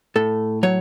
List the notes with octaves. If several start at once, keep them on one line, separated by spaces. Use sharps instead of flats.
A2 A4
F#3 C#5